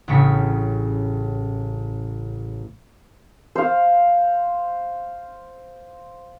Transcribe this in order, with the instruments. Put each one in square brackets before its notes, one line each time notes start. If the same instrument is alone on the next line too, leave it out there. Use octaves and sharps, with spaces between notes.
[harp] A1 A2 C#3 C#6 B6
[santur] C5 F5